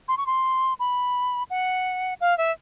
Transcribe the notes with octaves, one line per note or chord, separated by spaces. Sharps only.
C6
C#6
C6
B5
F#5
F5
E5